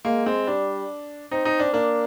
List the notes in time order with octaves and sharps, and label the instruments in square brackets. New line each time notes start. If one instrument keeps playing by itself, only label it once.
[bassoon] G#3 [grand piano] A#3
[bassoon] G#3 [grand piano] C4
[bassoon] G3 [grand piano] D4
[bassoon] C4 [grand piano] D#4
[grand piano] D#4
D4
[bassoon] A#3 [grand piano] D4